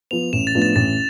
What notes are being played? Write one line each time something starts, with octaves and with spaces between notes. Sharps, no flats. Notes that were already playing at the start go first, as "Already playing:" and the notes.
F3 B3 F7
A1 E7
A6
A2 F3 B3 D4
A6
A1 A6